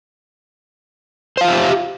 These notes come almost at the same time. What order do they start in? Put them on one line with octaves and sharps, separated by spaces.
C5 F5 F4 E5 G4